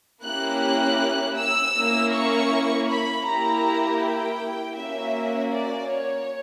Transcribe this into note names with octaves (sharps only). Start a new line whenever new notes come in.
A#3 C#4 E4 G4 F#6
F#6
E6
A#3 C#4 E4
C#6
B5
A#3 E4 G4 A#5
G5
A#3 C#4 F#4 E5
D5
C#5